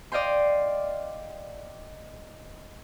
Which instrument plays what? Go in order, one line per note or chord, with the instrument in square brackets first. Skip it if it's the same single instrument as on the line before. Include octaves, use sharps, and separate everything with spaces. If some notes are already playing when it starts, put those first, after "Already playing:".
[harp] D5 D#5 F5 G5 C6